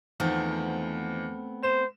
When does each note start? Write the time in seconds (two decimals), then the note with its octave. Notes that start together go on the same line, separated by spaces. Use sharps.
0.20 E2 D#3 F3 A3 B3 C4
1.63 C5 E7